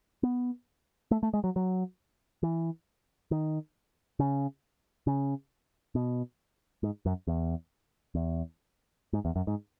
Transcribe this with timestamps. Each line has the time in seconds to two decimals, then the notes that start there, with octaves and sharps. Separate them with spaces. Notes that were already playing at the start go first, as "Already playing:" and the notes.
0.23 B3
1.11 A3
1.23 A3
1.33 G#3
1.44 F#3
1.56 F#3
2.43 E3
3.31 D#3
4.19 C#3
5.07 C#3
5.95 B2
6.83 G#2
7.06 F#2
7.27 E2
8.15 E2
9.13 G#2
9.25 E2
9.36 F#2
9.47 G#2